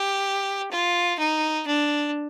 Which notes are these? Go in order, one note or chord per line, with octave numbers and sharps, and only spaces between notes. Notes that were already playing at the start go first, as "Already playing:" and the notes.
Already playing: G4
F4
D#4
D4